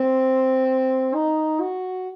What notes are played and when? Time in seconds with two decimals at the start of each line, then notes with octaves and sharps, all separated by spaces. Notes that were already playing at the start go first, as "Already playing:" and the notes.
Already playing: C4
1.14 D#4
1.60 F#4